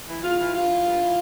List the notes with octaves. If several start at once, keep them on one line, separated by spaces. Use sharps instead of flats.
E3
E2 F4
E3
G2 F4
E3
G2
E3